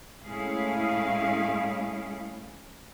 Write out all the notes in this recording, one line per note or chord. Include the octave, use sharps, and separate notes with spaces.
A2 G#3 C#4 E4 G#4 F5